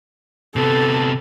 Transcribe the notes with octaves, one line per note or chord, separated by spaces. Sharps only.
C3 B3 A4